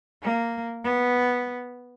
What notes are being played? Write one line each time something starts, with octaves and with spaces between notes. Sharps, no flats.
A#3
B3